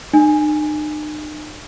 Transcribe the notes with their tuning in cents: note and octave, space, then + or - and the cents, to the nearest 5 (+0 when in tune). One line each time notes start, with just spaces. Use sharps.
D#4 -45 G#5 +0